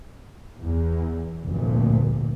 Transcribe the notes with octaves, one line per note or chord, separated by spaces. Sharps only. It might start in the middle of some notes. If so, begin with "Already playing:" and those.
E2
F1 D2 G2 A#2